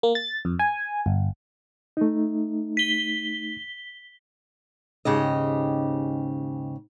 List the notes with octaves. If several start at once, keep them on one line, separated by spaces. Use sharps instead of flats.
A#3
A6
F2
G#5
G1
A3 D#4
B6 G7
D#2 G#2 C#3 G4 D#5